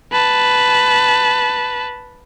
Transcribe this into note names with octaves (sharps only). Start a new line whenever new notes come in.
B4 A5